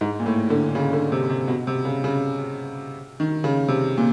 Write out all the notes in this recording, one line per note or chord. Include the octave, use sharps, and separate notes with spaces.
G#2
A#2
A2
D3
C#3
D3
C3
C3
B2
C3
C#3
C#3
D#3
C#3
C3
A#2